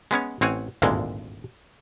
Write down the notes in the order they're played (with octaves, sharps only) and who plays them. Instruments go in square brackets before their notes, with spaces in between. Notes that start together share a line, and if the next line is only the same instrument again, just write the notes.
[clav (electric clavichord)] G#3 B3 C#4 C#5
A1 C4 C#5 F#5 G#5
G#1 D2 G2 A#2 D3 G#3